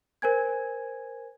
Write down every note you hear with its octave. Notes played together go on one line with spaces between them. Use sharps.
A#4 C5 G#5 G#6